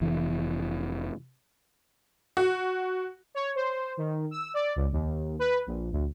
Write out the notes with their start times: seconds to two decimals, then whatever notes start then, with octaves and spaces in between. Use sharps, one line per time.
0.01 F1 E3
2.37 F#4
3.35 C#5
3.56 C5
3.97 D#3
4.31 E6
4.54 D5
4.76 C#2
4.92 D#2
5.39 B4
5.67 A#1
5.92 D2